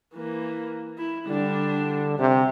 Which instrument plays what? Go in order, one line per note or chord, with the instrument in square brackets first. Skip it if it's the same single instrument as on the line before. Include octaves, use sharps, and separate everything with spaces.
[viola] E3 A#3
E4
[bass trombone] D3 [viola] G3 D4
[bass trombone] C3 [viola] G4